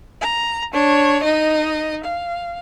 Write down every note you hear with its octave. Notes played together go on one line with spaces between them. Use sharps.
A#5
D4 C#5
D#4 D#5
F5